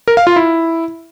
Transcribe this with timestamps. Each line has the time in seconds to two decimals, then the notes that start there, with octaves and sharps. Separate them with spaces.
0.08 A#4
0.17 F5
0.27 F4
0.36 E4